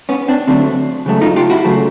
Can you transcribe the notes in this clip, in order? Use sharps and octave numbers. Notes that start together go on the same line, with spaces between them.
B3 C#4
C4 D4
D3 F#3 A3 C4 D4
C#3 F#3 A3
D#4 F4
F4 G4
E4 F#4
C#3 F#3 A3